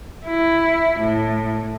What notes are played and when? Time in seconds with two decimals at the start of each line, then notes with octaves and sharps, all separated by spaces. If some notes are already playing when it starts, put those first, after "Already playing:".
0.24 E4
0.99 A2